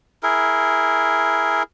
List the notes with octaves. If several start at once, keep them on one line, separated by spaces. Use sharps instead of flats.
E4 G#4 A#4